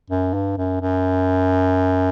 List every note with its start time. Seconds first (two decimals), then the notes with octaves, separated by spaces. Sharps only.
0.10 F#2
0.34 G2
0.58 F#2
0.81 F#2